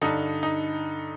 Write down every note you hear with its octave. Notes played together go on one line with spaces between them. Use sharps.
G2 D3 D#4
D#4